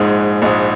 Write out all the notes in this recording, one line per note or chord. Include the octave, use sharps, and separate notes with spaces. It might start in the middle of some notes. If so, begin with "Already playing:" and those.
Already playing: A#1 G#2 G#3 D#4
A#1 G#2 G#3 D#4